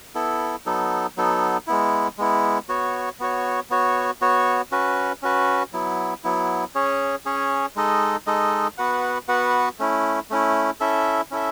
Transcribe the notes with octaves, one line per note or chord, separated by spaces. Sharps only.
B3 E4 A4
F#3 B3 D#4 A4
F#3 B3 D#4 A4
G#3 B3 E4
G#3 B3 E4
B3 F#4 C#5
B3 F#4 C#5
B3 F#4 C#5
B3 F#4 C#5
C#4 F#4 B4
C#4 F#4 B4
F#3 B3 E4
F#3 B3 E4
C#4 G#4 C#5
C#4 G#4 C#5
G#3 D#4 A4 D#5
G#3 D#4 A4 D#5
B3 F#4 B4 F#5
B3 F#4 B4 F#5
A3 C#4 E4
A3 C#4 E4
C#4 E4 A4 E5
C#4 E4 A4 E5